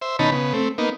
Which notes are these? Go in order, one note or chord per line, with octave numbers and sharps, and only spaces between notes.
C5 E5
B2 D#3 C#4 D#4 A5 B5
C#3 B3
A3 C4
A#3 B3 D#4